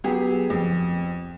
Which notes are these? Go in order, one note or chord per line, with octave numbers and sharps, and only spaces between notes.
F#3 B3 G4 G#4
F2